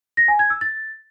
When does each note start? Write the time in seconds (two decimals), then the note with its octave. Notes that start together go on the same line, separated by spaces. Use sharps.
0.17 A#6
0.28 G#5
0.39 G#6
0.50 E6
0.61 A6